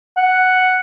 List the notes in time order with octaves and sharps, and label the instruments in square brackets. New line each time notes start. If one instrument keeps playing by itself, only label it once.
[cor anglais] F#5